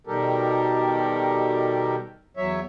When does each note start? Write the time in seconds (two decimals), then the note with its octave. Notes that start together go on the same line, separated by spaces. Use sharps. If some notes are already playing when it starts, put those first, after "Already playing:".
0.07 B2 D#3 G3 G4 A4 A#4
2.37 E2 F#3 C#5 E5